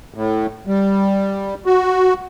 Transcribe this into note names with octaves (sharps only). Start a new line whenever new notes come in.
A2
G3
F#4